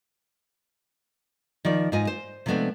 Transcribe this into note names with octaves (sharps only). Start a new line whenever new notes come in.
D#3 F3 D5
G#2 F4 D#5 G#5
C5
C3 F3 G#3 A3 B3 D4